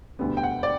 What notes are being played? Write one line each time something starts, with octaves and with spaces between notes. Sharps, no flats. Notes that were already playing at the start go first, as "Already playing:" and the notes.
E1 D2 D3 G3 B3
G5
F#5
D5